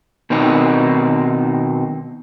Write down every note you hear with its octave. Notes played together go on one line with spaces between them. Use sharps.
B2 D#3 C4 D#4